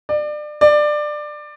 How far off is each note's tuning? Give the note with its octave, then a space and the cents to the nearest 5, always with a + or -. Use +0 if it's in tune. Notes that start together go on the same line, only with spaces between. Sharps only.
D5 +30
D5 +20